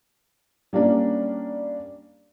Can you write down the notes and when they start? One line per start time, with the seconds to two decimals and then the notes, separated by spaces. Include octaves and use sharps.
0.73 G3 A#3 C#4 D4